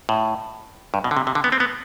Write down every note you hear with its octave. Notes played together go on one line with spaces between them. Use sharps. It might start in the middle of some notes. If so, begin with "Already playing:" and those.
A2
G2
B2
D3
C3
C3
D3
B3
C4
B3